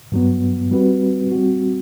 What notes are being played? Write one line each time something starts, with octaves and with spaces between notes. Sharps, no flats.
G2 F#3 B3
G3 C4 F#4 B4
G3 C4 F#4